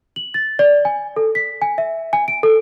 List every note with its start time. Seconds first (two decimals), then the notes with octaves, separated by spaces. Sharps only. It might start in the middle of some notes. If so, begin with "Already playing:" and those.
0.16 F#7
0.34 A6
0.59 D5
0.85 G#5
1.16 A4
1.35 B6
1.62 G#5
1.78 E5
2.13 G#5
2.28 D7
2.43 A4